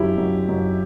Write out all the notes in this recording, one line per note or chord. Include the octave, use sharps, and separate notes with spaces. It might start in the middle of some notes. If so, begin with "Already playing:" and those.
Already playing: F#2 D3 E4 G4
F#2
F#2